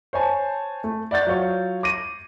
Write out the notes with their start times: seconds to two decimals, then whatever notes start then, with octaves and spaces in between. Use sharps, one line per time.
0.13 C5 C#5 G#5 A5
0.84 A3
1.11 D5 E5 F#5 G6 A6
1.27 F#3 F4 C#5
1.83 D6 A#6 D#7